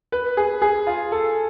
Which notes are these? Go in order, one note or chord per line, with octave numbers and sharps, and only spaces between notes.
B4
G#4
G#4
F4
A4